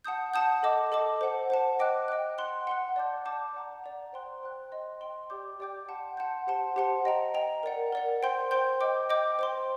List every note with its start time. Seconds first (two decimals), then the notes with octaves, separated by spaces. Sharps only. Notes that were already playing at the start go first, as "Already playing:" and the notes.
0.04 F#5 A5 D#6 G6
0.34 F#5 A5 D#6 G6
0.63 A4 D#5 A5 D6
0.92 A4 D#5 A5 D6
1.21 C5 F#5 A5
1.50 C5 F#5 A5
1.79 D#5 G5 D6 F#6
2.08 D#5 G5 D6 F#6
2.38 F#5 C6 F#6
2.67 F#5 C6 F#6
2.96 D5 A5 D6 G6
3.25 D5 A5 D6 G6
3.55 D5 F#5 A#5
3.84 D5 F#5 A#5
4.13 C5 G5 C6 F#6
4.42 C5 G5 C6 F#6
4.72 D#5 G5 C6
5.01 D#5 G5 C6
5.30 G4 D5 G5 D6 G6
5.60 G4 D5 G5 D6 G6
5.89 F#5 A5 C6 G6
6.17 F#5 A5 C6 G6
6.47 G4 C5 F#5 A5 C6
6.76 G4 C5 F#5 A5 C6
7.05 D#5 G5 A#5
7.34 D#5 G5 A#5
7.63 A#4 D5 F#5
7.92 A#4 D5 F#5
8.22 C5 G5 C6 G6
8.51 C5 G5 C6 G6
8.81 D#5 G5 D6 G6
9.10 D#5 G5 D6 G6
9.39 C5 G5 C6